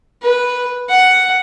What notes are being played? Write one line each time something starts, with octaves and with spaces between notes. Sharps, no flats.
B4
F#5